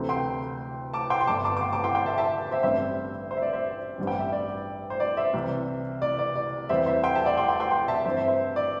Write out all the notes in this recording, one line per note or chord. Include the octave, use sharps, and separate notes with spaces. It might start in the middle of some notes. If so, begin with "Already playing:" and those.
Already playing: D2 C3 E3 A3 C4
G5 C6
A5 D6
G5 C6
C6
G1 G2 D3 A5 D6
A5 D6
D6
G5 C6
A5 D6
G5 C6
G5 C6
E5 A5
E5 A5
C5 E5
A1 G2 G3 C4 C5 E5
C5
E5
D5
C5 E5
A1 G2 G3 C4
G5
E5
D5
C5
D5
C5 E5
C2 C3 E3
D5
D5
D5
E2 E3 G3 C4 C5 E5
C5 E5
G5 C6
E5 A5
D5 G5
G5 C6
G5 C6
G5 C6
G5 C6
E5 A5
G2 E3 C4 C5 E5
C5 E5
C5 E5
D5